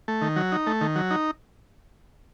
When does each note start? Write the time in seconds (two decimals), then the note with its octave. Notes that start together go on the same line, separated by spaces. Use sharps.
0.08 A3
0.22 D#3
0.36 F#3
0.52 D#4
0.67 A3
0.81 D#3
0.96 F#3
1.11 D#4